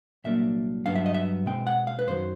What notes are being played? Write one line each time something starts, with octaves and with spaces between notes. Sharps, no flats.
C2 A#2 F#3 A#3 D4 E5
G2 D3 F#3 B3 D4 F5
E5
D#5
E5
B2 G#3 C4 G5
F#5
F5
B4
F#2 D#3 F#3 C5